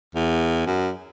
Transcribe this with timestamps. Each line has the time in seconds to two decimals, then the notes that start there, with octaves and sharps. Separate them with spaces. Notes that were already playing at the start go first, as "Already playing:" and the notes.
0.15 E2
0.66 F#2